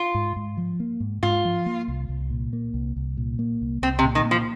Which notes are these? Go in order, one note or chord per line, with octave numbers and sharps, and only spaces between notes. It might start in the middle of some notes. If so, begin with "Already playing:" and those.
Already playing: F4
G#2
G#2
F3
A#3
G#2
G#2 F4
F3
A#3
C2
C2
A#2
A#3
C2
C2
A#2
A#3
C2
C2 C4
C3
A#2
D#3
A#3
F3